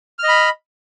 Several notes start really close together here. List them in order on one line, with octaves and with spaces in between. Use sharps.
F6 D#5 B5